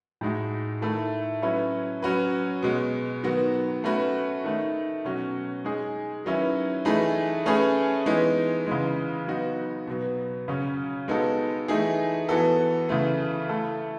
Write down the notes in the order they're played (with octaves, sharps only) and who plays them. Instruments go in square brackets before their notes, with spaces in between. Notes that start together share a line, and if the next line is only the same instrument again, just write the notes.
[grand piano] A2 G#3 D#4 F#4
D#3 A3 E4 A4
F#3 C#4 E4 B4
F#3 C#4 F#4 B4
B2 G#3 B3
D#3 F#3 B3 F#4
A3 C#4 F#4 B4
D#3 A3 D#4
B2 F#3 C#4 F#4
G#3 D#4 G#4
D#3 F#3 C#4 E4 B4
E3 A3 D#4 G#4 B4
A3 C#4 G#4 B4
E3 G#3 B3 D#4
C#3 E3 G#3
F#3 B3 D#4 F#4
B2 F#3 B3
C#3 F#3 C#4
G#3 B3 D#4 F#4 A4
E3 A3 D#4 G#4
E3 B3 F#4 A4
C#3 E3 A3
A3 E4 A4